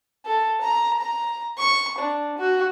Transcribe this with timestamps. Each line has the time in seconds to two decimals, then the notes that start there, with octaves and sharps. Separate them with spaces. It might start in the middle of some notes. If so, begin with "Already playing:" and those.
0.25 A4
0.61 A#5
1.00 A#5
1.58 C#6
1.99 D4
2.38 F#4